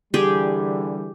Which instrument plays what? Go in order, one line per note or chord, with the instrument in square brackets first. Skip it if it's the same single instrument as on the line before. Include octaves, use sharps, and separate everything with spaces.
[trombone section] D3 E3 G3 [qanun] G4 G#4